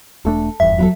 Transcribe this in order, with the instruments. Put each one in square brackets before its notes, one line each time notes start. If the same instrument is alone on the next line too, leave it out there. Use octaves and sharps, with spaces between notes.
[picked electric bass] E1 A3 D4 [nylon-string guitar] A4
[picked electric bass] F1 E2 G2 [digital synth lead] E5
[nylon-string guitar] F#3 E4 A4